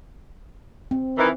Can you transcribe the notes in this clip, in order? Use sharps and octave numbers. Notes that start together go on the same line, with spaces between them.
C4
D#3 E3